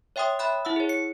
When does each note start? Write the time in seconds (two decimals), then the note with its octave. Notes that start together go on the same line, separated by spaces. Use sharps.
0.16 C#5 E5 G5 C6 D#6
0.39 E5 B5 F#6
0.65 E4 F#5 E6
0.76 G#4 C#5
0.89 C#7